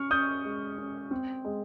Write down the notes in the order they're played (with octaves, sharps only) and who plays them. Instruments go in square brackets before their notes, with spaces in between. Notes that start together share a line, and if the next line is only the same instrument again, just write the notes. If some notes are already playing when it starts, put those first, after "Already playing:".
Already playing: [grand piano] C#4 C#6 F6
C#4 D#6 G6
G#3
C#4
C4
G#3